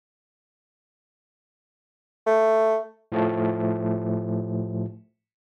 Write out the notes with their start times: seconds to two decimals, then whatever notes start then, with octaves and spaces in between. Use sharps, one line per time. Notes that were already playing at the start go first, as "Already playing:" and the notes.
2.27 A3
3.12 A2 F3 A3